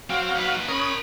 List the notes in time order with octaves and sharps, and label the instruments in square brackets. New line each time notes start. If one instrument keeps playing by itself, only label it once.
[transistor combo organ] F#3 F5 [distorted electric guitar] C4
[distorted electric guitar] D#2 B4
[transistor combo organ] C#4 D#6 [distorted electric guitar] A#4 B5